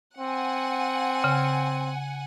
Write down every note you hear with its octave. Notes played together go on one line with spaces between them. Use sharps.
C4 F#5 G#5
C#3